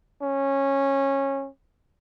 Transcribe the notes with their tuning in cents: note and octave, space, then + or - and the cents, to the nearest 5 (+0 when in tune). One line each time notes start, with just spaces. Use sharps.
C#4 -15